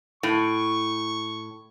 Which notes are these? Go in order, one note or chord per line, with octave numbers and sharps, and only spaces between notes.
A2 C#6